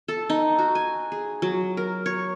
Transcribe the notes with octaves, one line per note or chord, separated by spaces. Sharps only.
A4
D#4
F#4
G#5
G#4
F#3
A#4
C#5